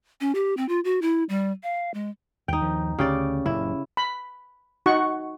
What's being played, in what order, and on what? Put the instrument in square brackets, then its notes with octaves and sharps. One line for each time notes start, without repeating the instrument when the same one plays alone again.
[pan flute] C#4
G4
C4
F4
F#4
E4
G3
F5
G#3
[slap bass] D#2 [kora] D#4 G5
[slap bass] D#2 D#3 F3
[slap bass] D2 [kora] C#3 G4 D5
[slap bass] F#1 A#2 C#4 [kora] E4
[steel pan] B5
D#4 F#4 F#5 C#6